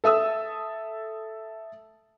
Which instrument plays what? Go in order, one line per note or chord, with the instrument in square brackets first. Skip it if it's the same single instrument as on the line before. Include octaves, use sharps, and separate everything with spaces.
[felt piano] A4 E5 D#6 E6